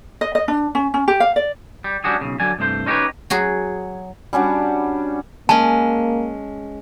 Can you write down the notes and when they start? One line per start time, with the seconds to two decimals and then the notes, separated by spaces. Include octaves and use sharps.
0.21 D#5
0.35 D#5
0.48 D4
0.75 C#4
0.94 C#4
1.08 G4
1.20 F5
1.36 D5
1.84 G3
2.04 G3 C#4 D4 F#4 G#4
2.21 B1 C#3
2.40 D3 F#3 D5 G#5
2.59 C2 G2 A3 C5
2.86 C#4 D#4 G4 A4 B4 C#5
3.30 F#3 F#4 G#4
4.33 G3 C#4 D4 F#4
5.49 G#3 A#3 C#4 A5